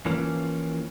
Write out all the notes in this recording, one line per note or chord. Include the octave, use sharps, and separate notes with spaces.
E3 F3 A#3 C#4